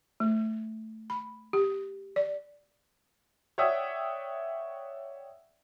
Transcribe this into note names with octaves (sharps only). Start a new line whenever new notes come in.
A3
B5
G4
D5
C#5 D5 E5 F#5 G5 D#6